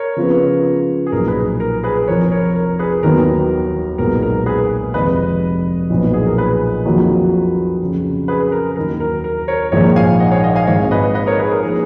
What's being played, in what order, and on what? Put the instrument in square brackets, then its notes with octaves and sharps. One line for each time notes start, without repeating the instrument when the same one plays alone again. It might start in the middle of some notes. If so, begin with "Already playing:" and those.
Already playing: [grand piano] A#4 C#5
[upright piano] C#3 F3 B3 F4 B4
[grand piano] G#4
[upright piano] B1 A#2 F3 [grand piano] A#4
[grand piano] G#4 B4
A#4
G#4 B4
[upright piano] F1 F2 F3 [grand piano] A#4 C#5
[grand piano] A#4 C#5
A#4
G#4 B4
[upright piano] D#2 D#3 F#3 B3 [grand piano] A#4
[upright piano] B1 A#2 G#3 B3 [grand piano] A#4
[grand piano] A#4
G#4 B4
[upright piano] F1 F2 D#3 G#3 [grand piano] B4 D#5
[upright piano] B1 A#2 F3 B3
[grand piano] G#4
A#4
G#4 B4
[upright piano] F2 D#3 F#3 A#3 F4
F2 C#3 F#3
[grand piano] G#4 B4
A#4
[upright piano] D#2 D#3 F#3 [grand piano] A#4
[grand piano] A#4
A#4
A#4 C#5
[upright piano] A#1 G#2 D#3 A#3 [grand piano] A#4 C#5
[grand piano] F5 G#5
D#5 F#5
C#5 F5
D#5 F#5
F5 G#5
[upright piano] G#1 G#2 D#3 [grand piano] C#5 F5
[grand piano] B4 D#5
B4 D#5
A#4 C#5
G#4 B4
A#4
[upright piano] F3 A#3 D#4 [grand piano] G#4